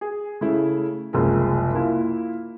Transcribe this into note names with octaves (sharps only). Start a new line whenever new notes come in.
G#4
C#3 A3 E4
F#1 C2 F3 G#3
A#3 E4 F4